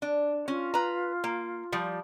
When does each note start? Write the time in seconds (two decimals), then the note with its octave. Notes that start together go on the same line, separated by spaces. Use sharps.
0.02 D4
0.48 C#4 F4
0.74 B4 A#5
1.24 A#3
1.72 F3 G3